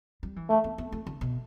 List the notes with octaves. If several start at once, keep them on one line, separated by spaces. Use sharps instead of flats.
G3
E3
D3 A3
B3
B3
A3
D3
B2